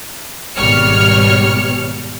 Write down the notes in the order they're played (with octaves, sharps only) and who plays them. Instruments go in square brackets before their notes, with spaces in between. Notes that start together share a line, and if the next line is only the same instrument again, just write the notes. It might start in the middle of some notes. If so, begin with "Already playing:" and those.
[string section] G#1 B2 G3 C#5 F6 C#7